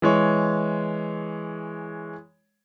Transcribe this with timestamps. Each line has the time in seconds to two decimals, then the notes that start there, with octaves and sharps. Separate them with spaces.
0.02 E3 G#3 C#5